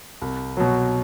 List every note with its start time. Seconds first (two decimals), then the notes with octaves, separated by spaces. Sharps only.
0.21 C2
0.57 B2 F#3